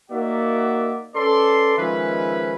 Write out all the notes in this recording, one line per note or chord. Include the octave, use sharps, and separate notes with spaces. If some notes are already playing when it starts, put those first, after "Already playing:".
A#3 D#4 F#4 D5 E5 F#5
C#4 A4 B4 D5 C6
D#3 F3 G#3 C#4 B4 E5